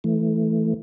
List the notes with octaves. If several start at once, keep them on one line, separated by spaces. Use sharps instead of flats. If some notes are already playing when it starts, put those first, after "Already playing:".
E3 A3